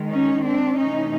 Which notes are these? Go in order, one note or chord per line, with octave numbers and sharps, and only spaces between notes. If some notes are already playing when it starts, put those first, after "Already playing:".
Already playing: D#3 G#3
C#4 D#4
C4 D4
C3 E3 A3 C#4 D#4